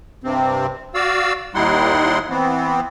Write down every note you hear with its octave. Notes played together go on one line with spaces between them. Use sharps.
G2 C3 C4
F#4 D5 F5 E6
D#2 G3 D#4 E4 F#5 C6
E3 B3 C4